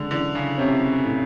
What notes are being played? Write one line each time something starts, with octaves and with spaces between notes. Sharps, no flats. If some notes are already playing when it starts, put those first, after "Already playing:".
Already playing: D3 G#3
D3 E3
C#3
C3 C#4
A2